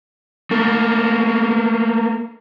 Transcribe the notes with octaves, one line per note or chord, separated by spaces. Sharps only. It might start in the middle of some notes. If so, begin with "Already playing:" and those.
A3 A#3